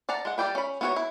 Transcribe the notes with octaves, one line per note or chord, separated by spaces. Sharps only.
D5 F#5 A5 A#5
G#3 F#5
G3 D5 G5 B5
C#4 B5
B3 E4 F#4 A#4 C#5
E4